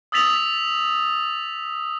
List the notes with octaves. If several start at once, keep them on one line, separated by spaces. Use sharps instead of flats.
D#6 E6 A6 B6 F7